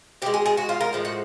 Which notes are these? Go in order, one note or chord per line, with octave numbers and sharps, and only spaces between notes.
B2 G#3 G4
G#4
G#4
F#4
F4
A#4
A2 F3 G#3
F#4